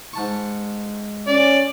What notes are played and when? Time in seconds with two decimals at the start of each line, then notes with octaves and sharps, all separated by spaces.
0.13 G#2 A5 C#6
1.27 C#4 D5